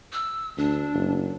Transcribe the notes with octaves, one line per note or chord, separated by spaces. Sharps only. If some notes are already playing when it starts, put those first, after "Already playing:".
E6
D2 D4
F#1